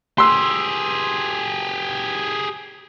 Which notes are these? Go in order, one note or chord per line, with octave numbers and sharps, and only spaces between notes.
G4 G#4 C6 E6